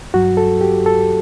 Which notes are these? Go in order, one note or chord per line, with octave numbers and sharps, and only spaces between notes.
G2 F#3 F#4
A4
G4
A4